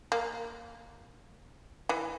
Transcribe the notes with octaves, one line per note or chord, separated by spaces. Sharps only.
A#3
E3